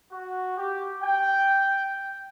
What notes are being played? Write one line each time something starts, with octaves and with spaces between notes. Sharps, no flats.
F#4
G4
G5